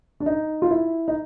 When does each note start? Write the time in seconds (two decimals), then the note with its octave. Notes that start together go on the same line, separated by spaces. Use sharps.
0.20 D4
0.26 D#4
0.62 F4
0.71 E4
1.08 D#4